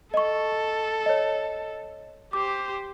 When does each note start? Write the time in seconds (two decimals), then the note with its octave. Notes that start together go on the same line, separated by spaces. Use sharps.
0.14 A4 D#5 C#6
1.06 C#5 D#5
2.33 G4 C5 D6